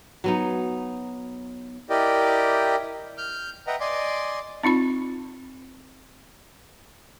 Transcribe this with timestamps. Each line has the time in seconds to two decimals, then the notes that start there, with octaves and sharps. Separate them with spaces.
0.24 F#3 B3 D#4
1.90 E4 G4 A#4 D5 D#5 G5
3.18 F6 G6
3.67 B4 D#5 E5 F#5 G5 A#5
3.80 D5 D#5 G#5 C6 D6
4.63 C4 D#4 F4 B5